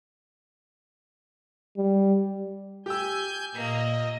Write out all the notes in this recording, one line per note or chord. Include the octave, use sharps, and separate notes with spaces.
G3
G4 G#5 E6 G6
A#2 A#3 D#5